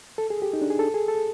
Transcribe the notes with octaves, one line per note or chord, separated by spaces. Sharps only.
A4
G#4
G4
D#4
D4
G#4
A4
G#4
A4